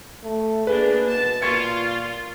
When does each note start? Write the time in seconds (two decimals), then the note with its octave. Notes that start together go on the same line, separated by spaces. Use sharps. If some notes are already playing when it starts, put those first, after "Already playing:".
0.24 A3
0.67 A#3 D4 G#4 B4
1.08 B2 A5
1.42 A#2 F4 C#6 G#6 C#7